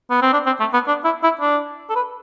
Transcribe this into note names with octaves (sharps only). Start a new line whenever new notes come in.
B3
C4
D4
C4
A3
B3
D4
E4
E4
D4
A4
B4